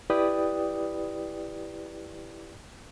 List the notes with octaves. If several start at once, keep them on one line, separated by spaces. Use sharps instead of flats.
E4 G4 B4 D5 G5 D#6